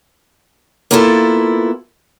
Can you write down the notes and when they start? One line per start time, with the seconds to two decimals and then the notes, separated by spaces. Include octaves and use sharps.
0.91 A#3 B3 E4 F4 A4